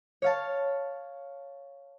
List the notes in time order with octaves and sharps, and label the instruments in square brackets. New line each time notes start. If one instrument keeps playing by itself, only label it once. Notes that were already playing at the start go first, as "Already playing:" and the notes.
[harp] C#5 F5 A5